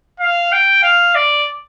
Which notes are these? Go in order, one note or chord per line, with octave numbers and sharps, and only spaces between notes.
F5
G5
F5
D5